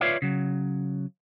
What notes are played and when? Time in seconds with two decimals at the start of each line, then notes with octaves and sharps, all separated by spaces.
0.01 F4 B4 C#5 D5 E5 F5
0.22 C#3 F#3